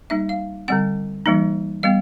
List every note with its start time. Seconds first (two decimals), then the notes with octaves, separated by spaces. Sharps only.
0.10 G3 A#3 D#4 E5
0.29 F5
0.68 D3 G3 C4 F#5
1.26 E3 G3 A#3 D#4
1.83 G3 B3 F5